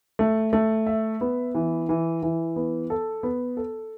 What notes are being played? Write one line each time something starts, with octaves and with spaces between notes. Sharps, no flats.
A3
A3
E5
B3
E3
E3
E3
B3
A4
B3
A4